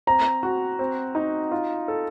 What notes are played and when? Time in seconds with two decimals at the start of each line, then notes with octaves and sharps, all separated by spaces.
0.07 C4 A#5
0.43 F#4
0.79 C4
1.15 D#4
1.51 F4
1.88 A4